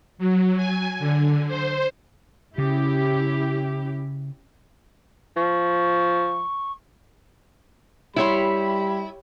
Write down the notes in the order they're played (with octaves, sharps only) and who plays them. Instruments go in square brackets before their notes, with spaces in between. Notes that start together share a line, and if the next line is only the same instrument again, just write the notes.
[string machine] F#3
G#5
D3
C5
[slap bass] C#3 [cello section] C#4 E4 G4
[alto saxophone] F3 [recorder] C#6
[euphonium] G3 [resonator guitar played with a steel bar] E4 [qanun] G4 C#5 C6 [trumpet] B5